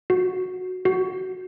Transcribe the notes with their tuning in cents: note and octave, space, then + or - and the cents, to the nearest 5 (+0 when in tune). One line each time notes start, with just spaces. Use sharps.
F#4 -10
F#4 +10